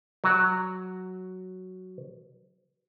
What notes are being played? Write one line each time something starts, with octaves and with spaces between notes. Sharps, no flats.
F#3 F#4